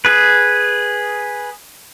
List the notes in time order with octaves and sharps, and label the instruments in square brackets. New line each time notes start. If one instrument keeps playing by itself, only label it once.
[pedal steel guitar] G#4 B4